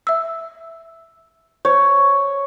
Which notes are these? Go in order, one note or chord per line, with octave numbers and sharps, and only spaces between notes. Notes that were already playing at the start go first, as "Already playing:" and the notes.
E5 E6
C5 C#5